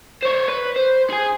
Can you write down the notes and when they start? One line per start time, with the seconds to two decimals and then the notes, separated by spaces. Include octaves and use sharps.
0.23 C5 C#5
0.48 B4
0.76 C5
1.10 G#4 G#5